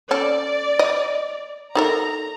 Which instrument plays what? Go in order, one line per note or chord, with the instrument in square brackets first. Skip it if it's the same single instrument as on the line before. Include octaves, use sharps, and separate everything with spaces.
[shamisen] C#4 A4 [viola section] D5
[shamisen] D#5
[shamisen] D#4 A4 A#4 [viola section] A#5